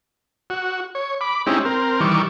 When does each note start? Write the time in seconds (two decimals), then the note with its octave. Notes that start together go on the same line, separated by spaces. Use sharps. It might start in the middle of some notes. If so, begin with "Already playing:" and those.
0.50 F#4
0.95 C#5
1.21 B5 D6
1.47 G#3 C4 C#4 D#4 E4 G4
1.65 C4 A#4
2.00 D#3 E3 G3 C#6 D6